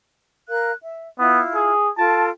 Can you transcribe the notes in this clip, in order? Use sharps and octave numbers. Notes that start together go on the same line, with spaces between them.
A#4 F5 F#6
E5
B3 E4 F4 F5
G#4
F4 A4 G5 A5